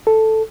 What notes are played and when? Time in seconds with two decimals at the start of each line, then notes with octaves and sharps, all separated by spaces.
0.07 A4